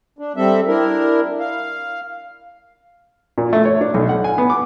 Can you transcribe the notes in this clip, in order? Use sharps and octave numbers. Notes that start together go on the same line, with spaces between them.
D4
G3 C4 A4 E5
D4 E4 A#4
F5
A#2
A3
C#5
D4
B1
F#5
G#5
B3
D6